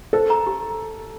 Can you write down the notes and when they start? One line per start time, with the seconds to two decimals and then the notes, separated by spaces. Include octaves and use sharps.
0.13 A4 C5
0.30 A#5
0.47 G4